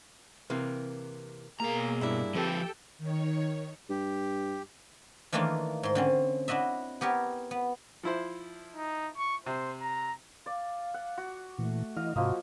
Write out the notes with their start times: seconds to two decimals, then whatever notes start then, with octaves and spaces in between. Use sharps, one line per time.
0.50 C3 E3 A#3
1.60 B2 A#3 G#4 A#5
2.01 G2 D4 E4
2.35 F3 C4 G4 A4 B4 G5
2.99 D#3 C#5
3.90 G2 G4
5.33 D#3 E3 A3 A#3 D4 F4
5.83 G#2 C6
5.95 D3 C4 C#4
6.48 D4 E4 F#4 D#5 E5
7.01 B3 G4 A#4 C#5
7.51 B3
8.03 F3 E4 C5
8.76 D#4
9.18 C#6
9.46 C3 C5
9.82 A#5
10.46 D5 F5
10.94 F#5
11.17 F#4
11.58 A#2 E3 A3
11.96 E3 E4 D#5 F5
12.16 G#2 C3 F3 A#3 F#4 D#5